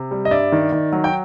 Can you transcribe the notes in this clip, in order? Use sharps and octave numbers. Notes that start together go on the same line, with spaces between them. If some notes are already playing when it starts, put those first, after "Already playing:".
Already playing: C3
G3
D#5
G2 D5 E5
D#3
D#3
F#3
G5